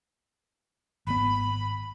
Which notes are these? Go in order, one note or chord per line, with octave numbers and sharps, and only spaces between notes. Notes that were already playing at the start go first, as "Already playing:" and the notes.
G#1 B3 B5